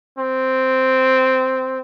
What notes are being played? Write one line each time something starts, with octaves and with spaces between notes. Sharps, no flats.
C4